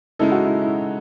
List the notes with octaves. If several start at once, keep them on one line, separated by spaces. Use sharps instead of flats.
C#3 G#3 D#4 E4 A4
F#4
E4
E4